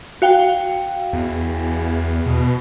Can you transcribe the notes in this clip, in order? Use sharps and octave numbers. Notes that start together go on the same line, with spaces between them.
F#4 F5 G5
E2
B2